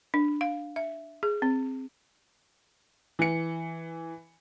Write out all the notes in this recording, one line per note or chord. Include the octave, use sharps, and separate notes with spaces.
D4
F5
E5
G#4
C4
E3 C#7